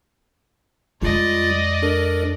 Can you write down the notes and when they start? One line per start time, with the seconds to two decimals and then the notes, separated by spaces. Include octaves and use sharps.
1.02 F2 G3 G#3 F4 D5 D#5 A6
1.82 D4 A4 A#4